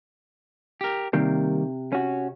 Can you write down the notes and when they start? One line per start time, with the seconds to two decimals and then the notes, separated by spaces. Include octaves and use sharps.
0.81 G4 A#4
1.13 C3 D#3 G3 A#3
1.92 C#4 F#4